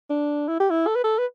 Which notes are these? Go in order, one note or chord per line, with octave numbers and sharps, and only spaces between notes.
D4
E4
G4
E4
A4
B4
A4
B4